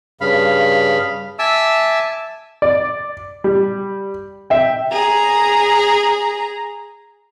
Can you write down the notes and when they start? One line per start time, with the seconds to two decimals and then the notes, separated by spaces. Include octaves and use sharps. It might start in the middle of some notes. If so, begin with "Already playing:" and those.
0.21 G2 C#3 F5 B5
1.39 E5 G#5 A5 D6 E6
2.62 D5
3.44 G3
4.50 E5 G5
4.92 G#4 A#5